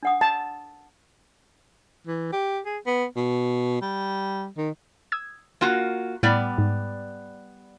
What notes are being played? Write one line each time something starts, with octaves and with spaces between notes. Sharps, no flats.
D4 F#5 D#6
A5
E3
G4
G#4
B3
B2
G3
D#3
D#6 E6 G#6
A#3 F4 F#4
A2 G3 B3 D5
G#2